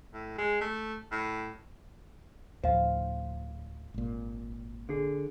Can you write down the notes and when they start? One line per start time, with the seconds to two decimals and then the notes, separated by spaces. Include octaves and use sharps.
0.14 A2
0.38 G#3
0.61 A3
1.12 A2
2.64 D2 A2 F3 C5 F5
3.94 G#1 A#2
4.89 D3 G#4